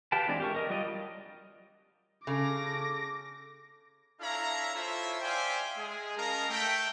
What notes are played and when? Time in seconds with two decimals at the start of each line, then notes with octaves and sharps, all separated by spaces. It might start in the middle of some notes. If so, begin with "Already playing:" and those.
0.12 G4 B4 F5 G5 A5
0.28 E3 G#3 C4 D4 D5
0.40 G4 A#4 C#6
0.55 A#4 D#5
0.70 F#3 G3 F4 D5 D#5
2.27 C#3 A4 D6 A#6
4.21 D4 E4 A4 C#5 F5 A#5
4.74 E4 F4 A4 C5 C#5 E5
5.21 C5 D5 E5 F5 G5 G#5
5.77 G#3 G#4
6.17 C#4 A#4 D#5 F5 A5 A#5
6.49 A3 G5